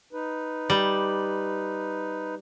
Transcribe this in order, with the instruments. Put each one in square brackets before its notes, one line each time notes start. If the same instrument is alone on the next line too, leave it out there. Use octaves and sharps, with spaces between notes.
[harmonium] D#4 B4
[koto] G3